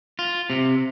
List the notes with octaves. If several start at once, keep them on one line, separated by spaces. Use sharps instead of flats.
F4
C3